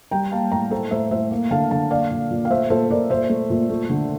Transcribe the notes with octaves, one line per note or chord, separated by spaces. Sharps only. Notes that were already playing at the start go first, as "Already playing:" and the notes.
G3 G5 A#5
A#3 F5 A5
A2 G5 A#5
A3 A4 C5
A2 C5 E5
A2 C5 E5
A#3
D3 F5 A5
D3 F5 A5
A#3 D5 F5
A#2
A#2
F5
A3 C5 E5
A#2 A4 C5
A#2 A#4 D5
A#2 C5 E5
A3
A#2
A3
D3